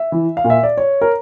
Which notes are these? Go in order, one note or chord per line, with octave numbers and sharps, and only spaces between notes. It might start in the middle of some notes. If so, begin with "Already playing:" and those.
Already playing: E5
E3
F5
A#2
E5
D5
C#5
A#4